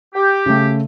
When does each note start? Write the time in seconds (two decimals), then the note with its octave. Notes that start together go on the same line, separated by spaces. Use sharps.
0.15 G4
0.46 C#3 A3